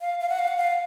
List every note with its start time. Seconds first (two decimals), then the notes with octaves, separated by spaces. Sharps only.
0.01 F5
0.20 F5
0.29 F#5
0.39 F5
0.48 F#5
0.57 F5